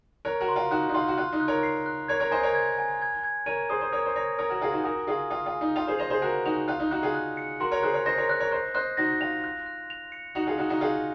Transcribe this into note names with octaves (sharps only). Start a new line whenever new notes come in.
A#4 C#5 F#6
F#4 A#4
C6
F4
D#4 F#4 F#6
D#4
F4 C6
F#4
F4 F#6
D#4
F#6
A#4 C#5
C7
F#6
A#4 C#5 G#6
A#4 C#5
C5 D#5 G#5
A#4 C#5
G#6
G#5
G#6
G#6
A#4 C#5 D#7
G#4 C5 D#6
C5
A#4 C#5 D#6
C5
A#4 C#5 A#6
A#4 C#5 D#6
F#4 A#4
F4 G#4 G#5
D#4 F#4
F#4 A#4 D#6
F4 G#4 D#6
F4 D#6
F4
G#5
D#4
F4 F7
G#4 C5
C5 D#5 F7
G#4 C5
F#4 A#4 F#6
D#4 F#4 F7
F4 F#6
D#4
D#4 F#4 F#6
F4 G#4
F#6
C#7
F#4 A#4 C6
A#4 C#5
G#4 C5 F#6
A#4 C#5
C5 D#5 A#6
A#4 C#5
A#4 C#5 F#6
A#4 C#5
C5 D#5 F#6
C5 D#5 F#6
D#4 F#4 A#6
F4 F7
F#6
F#6
F7
C#7
D#4 F#4 F7
F4 G#4
D#4 F#4 F#6
D#4 F#4
F4 G#4 F#6